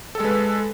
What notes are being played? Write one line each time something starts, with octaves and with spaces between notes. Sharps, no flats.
G#3 A4 B4